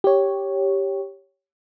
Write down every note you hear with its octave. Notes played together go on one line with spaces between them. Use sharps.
G4 C#5